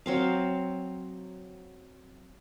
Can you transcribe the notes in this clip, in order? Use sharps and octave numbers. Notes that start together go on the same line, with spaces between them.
F#3 C4 F5